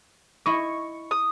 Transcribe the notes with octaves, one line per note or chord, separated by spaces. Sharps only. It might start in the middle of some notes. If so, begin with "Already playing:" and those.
E4 D#5 C#6
D#6